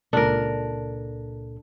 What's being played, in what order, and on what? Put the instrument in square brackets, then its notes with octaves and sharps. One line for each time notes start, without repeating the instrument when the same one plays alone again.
[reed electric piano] C#2 A#2 A4 [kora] D4 A#4